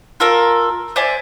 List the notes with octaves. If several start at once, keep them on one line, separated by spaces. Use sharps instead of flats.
F4 A4 A#4
C5 D5 E5 G#5